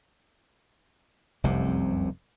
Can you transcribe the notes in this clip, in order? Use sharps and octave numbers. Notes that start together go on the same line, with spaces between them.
F1 C2 F#2 C3